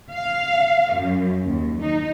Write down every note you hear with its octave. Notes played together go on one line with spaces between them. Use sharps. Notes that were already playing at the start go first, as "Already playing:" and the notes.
F5
F#2
D#2
D#4